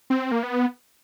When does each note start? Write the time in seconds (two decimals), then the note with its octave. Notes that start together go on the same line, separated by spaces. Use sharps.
0.10 C4
0.32 A#3
0.43 B3